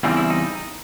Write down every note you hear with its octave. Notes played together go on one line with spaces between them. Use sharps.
E2 C#3 E3 G3 C4 D#4
E4
D#4